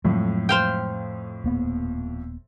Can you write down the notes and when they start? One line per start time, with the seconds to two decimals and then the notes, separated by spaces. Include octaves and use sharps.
0.04 F2 A2 F#3 G#3
0.49 C5 F5 G5
1.44 D#1 A#3 B3